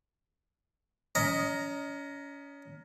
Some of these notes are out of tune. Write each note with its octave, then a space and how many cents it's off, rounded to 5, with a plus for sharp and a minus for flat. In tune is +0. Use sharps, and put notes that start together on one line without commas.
C#4 +30 D#5 +0 A#5 +0